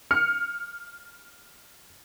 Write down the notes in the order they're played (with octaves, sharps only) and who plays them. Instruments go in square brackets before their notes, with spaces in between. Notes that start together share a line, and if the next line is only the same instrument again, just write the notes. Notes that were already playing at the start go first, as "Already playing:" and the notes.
[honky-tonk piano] F6 C#7